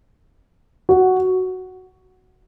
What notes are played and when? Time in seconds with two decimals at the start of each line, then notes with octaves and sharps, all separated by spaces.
0.89 F#4